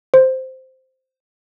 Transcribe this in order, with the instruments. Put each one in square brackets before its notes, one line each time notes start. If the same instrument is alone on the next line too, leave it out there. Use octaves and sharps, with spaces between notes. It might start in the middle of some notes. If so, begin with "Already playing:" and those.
[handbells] C5